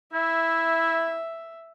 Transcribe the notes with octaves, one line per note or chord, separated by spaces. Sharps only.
E4 E5